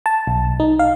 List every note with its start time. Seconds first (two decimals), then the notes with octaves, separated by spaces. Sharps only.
0.06 A5
0.27 B1
0.60 D#4
0.79 F5